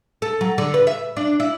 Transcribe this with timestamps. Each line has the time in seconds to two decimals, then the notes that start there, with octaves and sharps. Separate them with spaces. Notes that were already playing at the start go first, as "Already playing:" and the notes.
0.22 A4
0.41 F#3
0.58 D3
0.74 B4
0.87 E5
1.17 D4
1.40 E4